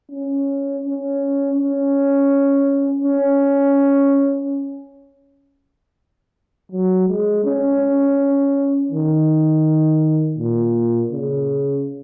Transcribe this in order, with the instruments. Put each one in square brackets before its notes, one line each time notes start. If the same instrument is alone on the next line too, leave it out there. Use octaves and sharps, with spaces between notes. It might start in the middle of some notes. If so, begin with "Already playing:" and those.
[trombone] C#4
C#4
C#4
C#4
F#3
G#3
C#4
D#3
A#2
C#3